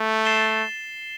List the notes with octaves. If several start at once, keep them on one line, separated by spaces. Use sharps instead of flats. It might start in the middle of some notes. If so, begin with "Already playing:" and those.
Already playing: A3
A6 C7 E7 G7